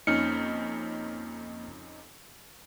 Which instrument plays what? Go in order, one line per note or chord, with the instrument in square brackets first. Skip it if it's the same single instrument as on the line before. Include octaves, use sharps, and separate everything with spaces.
[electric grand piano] F2 C#4 D#4 [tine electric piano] A#3 F6 C#7